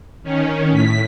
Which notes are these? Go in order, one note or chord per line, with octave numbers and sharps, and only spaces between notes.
D#3 C#4
A2 B6